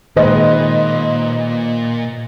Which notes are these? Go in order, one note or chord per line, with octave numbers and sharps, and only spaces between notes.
A#2 D#3 G#3 B4 C5 D#5